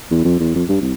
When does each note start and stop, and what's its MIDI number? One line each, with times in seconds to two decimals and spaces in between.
0.10 0.20 40
0.24 0.37 41
0.40 0.50 40
0.55 0.64 41
0.69 0.80 43
0.81 0.93 36